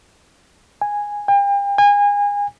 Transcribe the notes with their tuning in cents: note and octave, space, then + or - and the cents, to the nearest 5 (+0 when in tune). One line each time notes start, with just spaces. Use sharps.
G#5 -10
G5 +40
G#5 -30